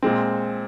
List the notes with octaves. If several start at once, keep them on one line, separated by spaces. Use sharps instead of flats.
A#2 G#3 C4